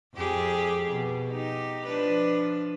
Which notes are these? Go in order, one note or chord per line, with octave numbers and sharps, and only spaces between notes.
F2 G4 G#4
B2
D#4 G4
F3 D4 B4